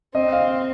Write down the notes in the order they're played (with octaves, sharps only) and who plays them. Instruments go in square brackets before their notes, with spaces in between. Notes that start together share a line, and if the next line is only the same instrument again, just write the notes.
[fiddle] C4 [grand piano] D#5
[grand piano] F5